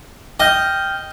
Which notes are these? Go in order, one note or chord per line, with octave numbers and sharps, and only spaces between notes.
D#5 G5 F6 G6